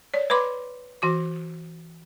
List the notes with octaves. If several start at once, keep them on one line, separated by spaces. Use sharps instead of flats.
C#5 D5
B4 B5 C6 D6
E3 F#4 D6